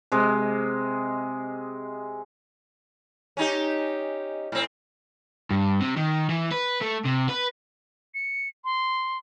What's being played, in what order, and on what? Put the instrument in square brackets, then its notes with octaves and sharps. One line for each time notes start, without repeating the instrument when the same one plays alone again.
[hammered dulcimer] C3 G#3 D#5
[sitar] C#4 D#4 G4
A2 C4
[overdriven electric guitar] G2
C3
D#3
E3
B4
A3
C3
B4
[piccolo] C#7
C6